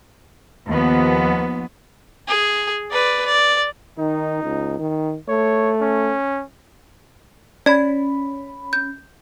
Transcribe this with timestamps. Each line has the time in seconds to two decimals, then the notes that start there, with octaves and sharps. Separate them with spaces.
0.67 D#2 F3 B3
2.28 G#4
2.92 B4 D5
3.26 D5
3.98 D#3 D#4
4.42 C#2
4.79 D#3
5.28 A3 C#5
5.81 C#4
7.66 C#4 D5 B5 G#6
8.73 G6